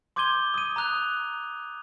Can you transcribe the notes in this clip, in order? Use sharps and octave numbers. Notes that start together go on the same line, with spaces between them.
C6 D6 G6 G#6 D#7 G7
D#6 D#7
A#5 D#6 F#6 F7